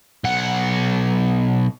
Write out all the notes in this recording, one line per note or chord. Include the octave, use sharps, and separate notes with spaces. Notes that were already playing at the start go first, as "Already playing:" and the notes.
B1 F#5